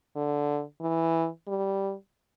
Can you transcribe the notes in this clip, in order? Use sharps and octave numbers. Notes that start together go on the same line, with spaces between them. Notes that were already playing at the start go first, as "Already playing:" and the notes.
D3
E3
G3